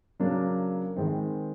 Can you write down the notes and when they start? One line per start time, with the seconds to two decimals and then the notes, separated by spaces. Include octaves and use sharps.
0.20 C#3 F#3 A#3 D4
0.96 D#3 G#3 C4 E4